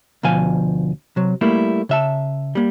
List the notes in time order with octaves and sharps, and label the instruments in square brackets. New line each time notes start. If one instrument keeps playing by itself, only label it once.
[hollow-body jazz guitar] D2 B2 F3 F5 G#5
C3 F#3
G3 A3 A#3 E4
C#3 E5 A5
G3 A#3